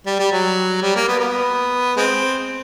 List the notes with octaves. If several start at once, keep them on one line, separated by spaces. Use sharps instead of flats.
G3
G3
F#3
G3
A#3
B3
B3
G#3 C4